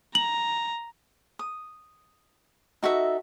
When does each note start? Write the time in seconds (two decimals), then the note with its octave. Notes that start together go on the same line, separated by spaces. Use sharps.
0.15 A#5 F#7
1.39 D#6
2.83 D#4 F#4 A4 E5